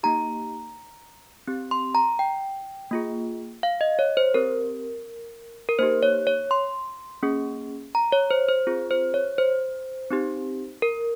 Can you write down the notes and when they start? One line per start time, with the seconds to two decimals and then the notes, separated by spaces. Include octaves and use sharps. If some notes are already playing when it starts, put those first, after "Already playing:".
0.03 A#3 D#4 G4 A#5
1.47 C4 G4
1.71 C6
1.95 A#5
2.19 G5
2.91 A#3 F4 G#4
3.63 F5
3.81 D#5
3.99 C#5
4.17 C5
4.34 C4 G4 A#4
5.69 A#4
5.79 A#3 D#4 G4 C5
6.03 C#5
6.27 C#5
6.51 C6
7.23 A#3 C#4 G#4
7.95 A#5
8.12 C#5
8.31 C5
8.49 C5
8.67 C4 F4 G#4
8.91 C5
9.14 C#5
9.38 C5
10.11 C4 D#4 G4
10.82 A#4